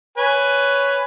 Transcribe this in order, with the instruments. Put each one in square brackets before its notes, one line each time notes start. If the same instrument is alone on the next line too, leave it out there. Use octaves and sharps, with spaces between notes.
[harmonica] B4 C#5 G#5